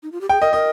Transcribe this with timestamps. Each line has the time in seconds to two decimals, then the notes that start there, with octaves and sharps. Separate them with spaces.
0.03 D#4
0.12 F4
0.21 G4
0.29 G#4 G5
0.41 A#4 D#5
0.53 A#4 D#5